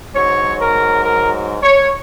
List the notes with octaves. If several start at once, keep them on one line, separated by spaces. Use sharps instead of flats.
G#2 F#3 C#5
A#4
A#4
C#5